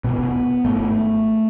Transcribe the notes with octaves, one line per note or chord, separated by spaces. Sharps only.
F1 E2 B2 B3
G#1 G#2 A3